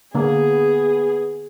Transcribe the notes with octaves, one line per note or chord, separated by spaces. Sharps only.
D3 A#3 B3 G#4